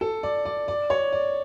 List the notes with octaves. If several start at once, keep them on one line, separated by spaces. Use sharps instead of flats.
A4
D5
D5
D5
C#5
D5